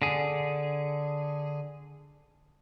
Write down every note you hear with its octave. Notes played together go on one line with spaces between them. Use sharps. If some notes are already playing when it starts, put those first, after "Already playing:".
D3 G#4